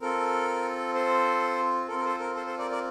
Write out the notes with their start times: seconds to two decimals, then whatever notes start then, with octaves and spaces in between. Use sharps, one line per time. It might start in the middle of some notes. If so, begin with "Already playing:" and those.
0.01 C4 F4 A4 A#4
0.95 A4 C5
1.88 C4 F4 A4 A#4
1.99 A#4
2.05 A4 C5
2.20 A#4
2.35 A4 C5
2.47 A4 C5
2.58 A#4 D5
2.71 A#4 D5